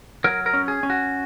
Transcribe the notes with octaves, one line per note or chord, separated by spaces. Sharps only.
F#3 A#4
A#4
C#4
G#4
C#4
F#4